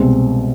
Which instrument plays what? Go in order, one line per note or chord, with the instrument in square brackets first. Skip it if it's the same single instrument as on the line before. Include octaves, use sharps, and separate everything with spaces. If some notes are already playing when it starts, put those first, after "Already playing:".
Already playing: [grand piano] C2 B2 G#3 C4